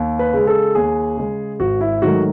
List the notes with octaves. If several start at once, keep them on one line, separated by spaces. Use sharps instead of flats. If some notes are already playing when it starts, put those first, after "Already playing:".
Already playing: D#2
B4
C#3 G#3
A4
D#2 G#4
C#3 G#3
G#1 F#4
E4
G#2 D#3 F#3 A3 F#4